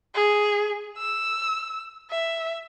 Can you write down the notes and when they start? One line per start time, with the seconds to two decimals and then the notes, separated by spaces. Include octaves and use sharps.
0.14 G#4
0.98 E6
2.10 E5